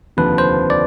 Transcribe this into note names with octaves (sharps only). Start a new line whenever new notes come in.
F1 D#2 D3 F3 B4
C5
D5